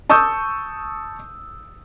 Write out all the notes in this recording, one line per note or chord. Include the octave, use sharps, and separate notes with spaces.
A5 C#6 D#6 E6 G6